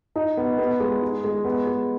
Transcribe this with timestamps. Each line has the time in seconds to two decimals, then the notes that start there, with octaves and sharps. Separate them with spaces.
0.16 D#4
0.37 B3
0.58 B3
0.80 G#3
1.02 D#4
1.24 G#3
1.45 B3
1.67 G#3